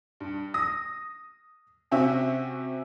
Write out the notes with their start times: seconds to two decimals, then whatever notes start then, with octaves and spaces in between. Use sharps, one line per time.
0.20 G2
0.54 D#6 A#6
1.91 C3 C4 C#4 F#4 E5